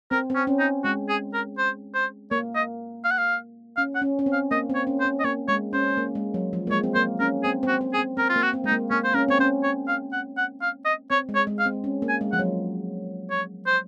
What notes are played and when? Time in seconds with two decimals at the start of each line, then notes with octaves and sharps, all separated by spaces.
0.11 C4 A#4
0.30 C4
0.35 C#4
0.47 C#4
0.59 D#4
0.84 G#3 F#4
1.09 G#4
1.34 A#4
1.58 C5
1.94 C5
2.31 A#3 C#5
2.55 D#5
3.04 F5
3.11 F#5
3.18 F5
3.77 C#4 F5
3.95 F#5
4.02 C#4
4.19 C#4
4.26 C4
4.33 F5
4.51 A#3 D#5
4.70 C4
4.75 C#5
4.87 C#4
5.00 C5
5.05 C#4
5.20 D#5
5.24 A#3 C#5
5.48 G#3 C#5
5.73 C#4 C5
5.97 A#3
6.15 G#3
6.34 F#3
6.53 F3
6.67 A#3
6.71 G#3 C#5
6.83 C4
6.95 A#3 C5
7.20 C#4 A#4
7.43 C4 G#4
7.63 C4 F#4
7.81 C4
7.93 G#4
7.98 C4
8.17 C4 A#4
8.29 F4
8.36 A#3
8.42 F#4
8.53 C4
8.64 G#3 D#4
8.72 A#3
8.91 A#3 C#4
9.04 C5
9.14 C#4 A#4
9.28 C4 C#5
9.39 C#4 C5
9.63 C#5
9.88 F5
10.13 F#5
10.37 F#5
10.62 F5
10.85 D#5
11.10 C4 C#5
11.29 G#3
11.35 C#5
11.47 G#3
11.59 F5
11.66 C4
11.84 C#4
12.02 A#3
12.09 G#5
12.21 G#3
12.32 F3 F#5
12.39 F#3
13.30 C#5
13.66 C5